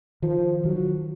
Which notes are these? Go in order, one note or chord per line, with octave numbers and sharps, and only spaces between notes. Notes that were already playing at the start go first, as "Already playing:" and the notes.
D#3 F3
D#3 F#3